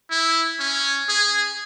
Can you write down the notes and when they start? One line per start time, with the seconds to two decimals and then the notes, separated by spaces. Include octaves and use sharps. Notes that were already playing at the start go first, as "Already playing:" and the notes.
0.11 E4
0.60 C#4
1.09 G#4